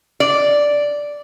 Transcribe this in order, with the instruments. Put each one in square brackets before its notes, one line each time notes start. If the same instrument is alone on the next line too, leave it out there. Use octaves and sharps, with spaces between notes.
[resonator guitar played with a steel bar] D5